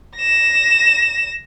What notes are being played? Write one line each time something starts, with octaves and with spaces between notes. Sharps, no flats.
A#6 E7